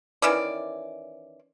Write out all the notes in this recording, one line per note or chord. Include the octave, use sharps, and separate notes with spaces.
D#3 E3 C#4 D5